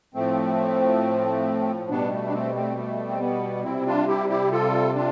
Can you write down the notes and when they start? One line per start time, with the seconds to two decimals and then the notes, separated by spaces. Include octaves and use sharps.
0.15 A2 F3 A3 C4
1.90 B2 G3 B3 D4
2.11 A3
2.27 D4
2.33 A3 C4
2.55 A3 C4
2.77 A3
3.09 C4
3.21 B3
3.64 C3 G3 C4 E4
3.86 D4 F4
4.08 E4 G4
4.29 E4 G4
4.52 F4 A4
4.95 D4 F4